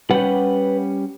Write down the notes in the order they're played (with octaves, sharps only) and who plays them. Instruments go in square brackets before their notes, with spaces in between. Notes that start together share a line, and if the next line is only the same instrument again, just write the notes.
[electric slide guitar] G3 C#4 G4 [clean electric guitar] B4 F#5